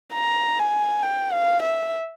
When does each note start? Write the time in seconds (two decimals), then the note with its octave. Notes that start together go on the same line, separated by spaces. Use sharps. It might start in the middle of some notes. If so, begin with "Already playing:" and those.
0.13 A#5
0.59 G#5
1.03 G5
1.32 F5
1.62 E5